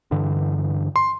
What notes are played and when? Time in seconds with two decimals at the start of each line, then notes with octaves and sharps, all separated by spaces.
0.11 G2 D3 E3
0.96 C6